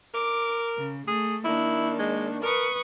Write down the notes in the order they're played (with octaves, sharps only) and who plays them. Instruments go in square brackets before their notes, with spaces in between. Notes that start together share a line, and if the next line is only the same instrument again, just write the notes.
[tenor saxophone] A#4 [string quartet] D6
[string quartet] C#3
[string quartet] A3 [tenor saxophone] G#4
[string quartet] D#3 A#3 D4 [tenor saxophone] E4
[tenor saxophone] G#3
[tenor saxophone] A#4 [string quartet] B4 C#6 D#6